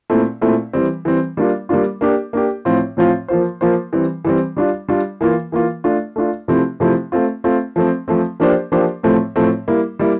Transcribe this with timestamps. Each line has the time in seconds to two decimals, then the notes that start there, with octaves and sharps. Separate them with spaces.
0.10 A#2 A3 C4 E4
0.41 A#2 A3 C4 E4
0.73 E3 G3 C4
1.05 E3 G3 C4
1.37 G3 A#3 D4 F4
1.69 G3 A#3 D4 F4
2.01 A#3 D4 G4
2.33 A#3 D4 G4
2.65 A2 F3 C4 F4
2.97 A2 F3 C4 F4
3.28 F3 A#3 F4 C5
3.61 F3 A#3 F4 C5
3.93 E3 G3 C4
4.25 E3 G3 C4
4.57 G3 D4 F4
4.89 G3 D4 F4
5.21 E3 A#3 F4
5.52 E3 A#3 F4
5.84 A3 D4 F4
6.16 A3 D4 F4
6.48 C3 F3 A3 C4 E4
6.80 C3 F3 A3 C4 E4
7.12 A3 C4 F4
7.44 A3 C4 F4
7.76 F3 A3 C4
8.08 F3 A3 C4
8.40 F3 A#3 D4 G4 C5
8.72 F3 A#3 D4 G4 C5
9.03 A2 F3 A3 C4
9.36 A2 F3 A3 C4
9.68 G3 A#3 E4
9.99 G3 A#3 E4